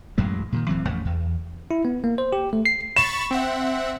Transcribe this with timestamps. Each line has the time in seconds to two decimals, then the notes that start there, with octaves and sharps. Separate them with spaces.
0.18 A1 F#2 F#3 G#3
0.52 A#2 D3 D#3
0.69 D1 E3 F#3 C4
0.87 A1 F2
1.05 E2
1.71 E4
1.85 B3
2.04 A#3
2.18 C5
2.33 G4
2.53 A3
2.66 C7
2.96 B5 C#6 A6 E7
3.31 C4 E5 F#5